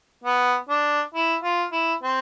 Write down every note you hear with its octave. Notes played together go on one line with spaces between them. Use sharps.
B3
D4
E4
F4
E4
C4